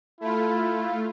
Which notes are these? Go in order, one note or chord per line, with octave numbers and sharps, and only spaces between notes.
A3 E4 F4